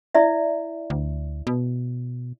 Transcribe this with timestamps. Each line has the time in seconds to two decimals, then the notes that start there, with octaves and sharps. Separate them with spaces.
0.15 E4 D5 E5
0.90 D2
1.47 B2